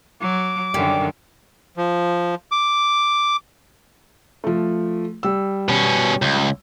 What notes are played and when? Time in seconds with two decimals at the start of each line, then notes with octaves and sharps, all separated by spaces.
0.21 F#3 D6
0.74 F#2 D3 D#3 G3
1.77 F3
2.51 D6
4.44 F3 A3
5.23 G3 E6
5.69 B2 C#4
6.22 C#2